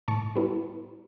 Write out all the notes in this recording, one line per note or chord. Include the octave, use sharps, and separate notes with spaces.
A2 A5 C#6
G3 B3 E4